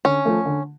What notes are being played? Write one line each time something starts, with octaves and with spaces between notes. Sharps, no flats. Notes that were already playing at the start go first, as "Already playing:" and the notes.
D3 C#4
F3 A3
D3